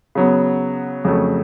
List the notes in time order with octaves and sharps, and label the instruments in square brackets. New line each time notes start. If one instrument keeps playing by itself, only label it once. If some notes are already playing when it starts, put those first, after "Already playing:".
[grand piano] C#3 F#3 B3
F2 C#3 F#3 A3